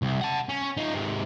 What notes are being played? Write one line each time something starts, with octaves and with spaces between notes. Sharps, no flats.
C2
F#5 A5
C#4
D#4 F4
G#2 C3